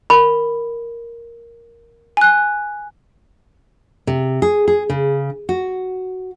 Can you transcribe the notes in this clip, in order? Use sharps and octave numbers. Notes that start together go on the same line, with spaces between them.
A#4 B5
G#5 F#6
C3
G#4
G#4
C#3
F#4